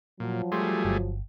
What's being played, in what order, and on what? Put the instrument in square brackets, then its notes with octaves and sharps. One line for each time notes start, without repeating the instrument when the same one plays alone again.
[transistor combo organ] A#2 [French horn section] F3 F#3
[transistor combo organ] G3 A3 G#4 [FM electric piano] C6
[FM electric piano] G1